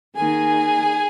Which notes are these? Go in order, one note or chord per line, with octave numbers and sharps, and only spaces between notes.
D#3 A#3 D#4 G#4 G#5